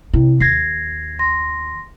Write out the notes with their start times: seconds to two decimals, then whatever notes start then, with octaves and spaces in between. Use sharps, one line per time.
0.14 C3 E4
0.40 D#2 G#6 A#6 C7
1.19 C6 A#6